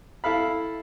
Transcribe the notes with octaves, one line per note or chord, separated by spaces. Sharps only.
E4 A4 F5 B5